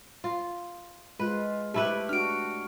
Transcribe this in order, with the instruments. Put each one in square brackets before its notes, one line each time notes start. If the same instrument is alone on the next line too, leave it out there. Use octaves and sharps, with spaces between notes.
[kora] F4
[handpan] G#3 F4 [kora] B4
[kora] A3 E4 B4 [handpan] G4
[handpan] D4 F#4 [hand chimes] F6 D7